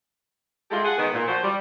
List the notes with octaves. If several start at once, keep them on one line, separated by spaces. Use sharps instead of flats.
G3 G#3 E4 F4 G4 A4
G#4 F#5
D#3 G#3 B3
A#2
F3 F#4 C5
G3